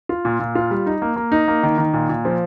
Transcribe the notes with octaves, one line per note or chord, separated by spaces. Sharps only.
F4
A#2
A#2
F4
G3
D#4
A#3
A#3
D#4
A#3
D#3
D#3
A#2
A#2
F3